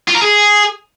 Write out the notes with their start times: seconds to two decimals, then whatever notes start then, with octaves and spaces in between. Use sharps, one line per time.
0.08 F4
0.15 A#4
0.22 G#4